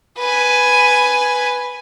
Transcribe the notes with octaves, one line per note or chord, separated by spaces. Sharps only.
B4 G#5